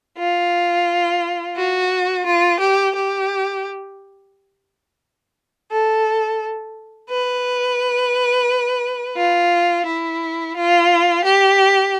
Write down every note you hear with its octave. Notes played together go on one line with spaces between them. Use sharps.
F4
F#4
F4
G4
G4
A4
B4
F4
E4
F4
G4